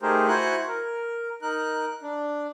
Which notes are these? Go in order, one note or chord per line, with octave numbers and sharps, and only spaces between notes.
A3 D#4 G4 G#4 A#4 C5
E4 F#4 C5 F#5 G#5 F#6
A#4
D#4 A#4 F#6
D4